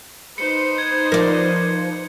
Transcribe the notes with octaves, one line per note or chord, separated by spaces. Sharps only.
D#4 B4 C5 C#7
G#6
F3 A#4 D5